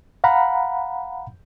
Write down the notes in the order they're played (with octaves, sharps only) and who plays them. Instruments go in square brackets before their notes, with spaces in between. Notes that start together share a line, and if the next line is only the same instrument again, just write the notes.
[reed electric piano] F5 F#5 A#5 B5